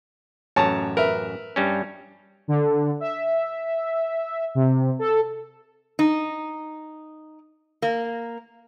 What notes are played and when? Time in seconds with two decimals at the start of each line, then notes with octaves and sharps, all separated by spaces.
0.56 A1 F#2 C#5 A5 A#5
0.97 A#4 B4 E5
1.56 G2 G3 C#4
2.48 D3
3.00 E5
4.55 C3
4.99 A4
5.99 D#4
7.82 A#3